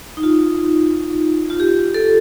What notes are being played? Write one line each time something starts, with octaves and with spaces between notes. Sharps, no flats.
D#4
F4
F4
G4
A4